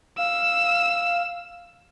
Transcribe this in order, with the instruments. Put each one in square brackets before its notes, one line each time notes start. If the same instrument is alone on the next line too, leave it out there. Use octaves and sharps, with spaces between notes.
[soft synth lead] F5 [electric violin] E6